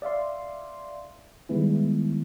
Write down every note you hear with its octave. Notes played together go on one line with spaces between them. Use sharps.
D5 E5 F5 C6
D#3 G3 G#3 B3 E4